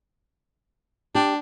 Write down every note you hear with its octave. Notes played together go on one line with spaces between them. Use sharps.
D4 G4